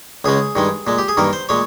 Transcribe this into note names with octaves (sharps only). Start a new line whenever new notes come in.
C#2 C#3 G#3 G#4
G2 D#3 G#3
A#2 G#3
G4
G#4
G2 D#3 A#3 A#4
C5
A#2 G#3 C#5